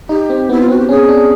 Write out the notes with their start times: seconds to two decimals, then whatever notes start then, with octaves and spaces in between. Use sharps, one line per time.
0.09 D#4 G4
0.30 C4
0.49 B3 E4
0.61 F4
0.68 C4 F#4
0.79 G4
0.88 C#4 G#4
1.09 D4